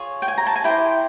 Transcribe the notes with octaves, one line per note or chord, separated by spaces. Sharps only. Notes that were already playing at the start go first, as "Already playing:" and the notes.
Already playing: F4 G#4 C#5
G5
G#5
A#5
A5
G#5
E4 G4 C5 G5